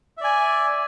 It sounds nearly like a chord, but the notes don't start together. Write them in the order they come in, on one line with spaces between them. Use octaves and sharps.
E5 D5 G#5